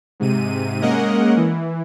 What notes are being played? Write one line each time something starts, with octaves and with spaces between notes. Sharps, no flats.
G#2 C3 D#7
G#3 A#3 C#4 A#4 D#5 F#5
E3